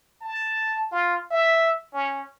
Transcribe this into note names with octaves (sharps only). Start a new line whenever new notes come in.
A5
F4
E5
C#4